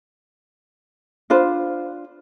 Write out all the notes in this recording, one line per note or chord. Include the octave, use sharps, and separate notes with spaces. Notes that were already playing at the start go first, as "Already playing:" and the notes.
D4 F4 B4 C5